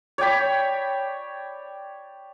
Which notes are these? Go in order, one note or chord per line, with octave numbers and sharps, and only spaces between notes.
C#5 D5 G5 B5